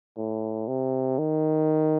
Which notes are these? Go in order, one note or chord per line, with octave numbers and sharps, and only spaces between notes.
A2
C3
D#3